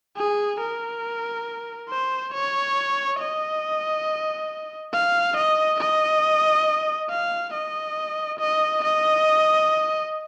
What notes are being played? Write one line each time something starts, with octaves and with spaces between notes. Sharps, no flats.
G#4
A#4
C5
C#5
D#5
F5
D#5
D#5
F5
D#5
D#5
D#5